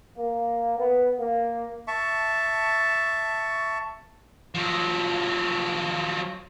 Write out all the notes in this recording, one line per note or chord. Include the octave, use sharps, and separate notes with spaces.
A#3
B3
A#3
E5 A5 C#6
F3 F#3